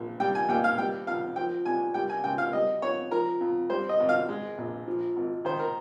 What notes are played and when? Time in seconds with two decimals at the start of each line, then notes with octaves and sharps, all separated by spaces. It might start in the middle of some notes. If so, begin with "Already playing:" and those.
Already playing: A#1
0.20 G3 G5
0.35 G#5
0.48 D#2 G5
0.64 F5
0.78 G3 G5
1.07 F2 F5
1.36 F3 G5
1.65 C2 G#5
1.94 G3 G5
2.09 G#5
2.24 C#2 G5
2.38 F5
2.53 G3 D#5
2.82 F2 C#5
3.11 F3 A#4
3.41 F2
3.70 G3 C5
3.89 D#5
4.00 G#1
4.09 F5
4.29 G#3
4.58 A#1
4.88 F3
5.16 G#1
5.45 D#3 C5
5.59 A#4